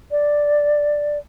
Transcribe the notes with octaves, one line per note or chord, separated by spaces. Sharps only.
D5